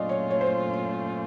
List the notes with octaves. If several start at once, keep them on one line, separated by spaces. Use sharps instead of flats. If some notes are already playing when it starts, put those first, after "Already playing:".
Already playing: A#2 F#3 A3 C#4 F4 D5 D#5
C#5
C#5
C5